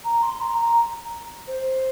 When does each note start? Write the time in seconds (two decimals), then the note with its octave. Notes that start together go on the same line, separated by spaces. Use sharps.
0.04 A#5
0.22 C6
0.40 A#5
0.58 A#5
1.47 C5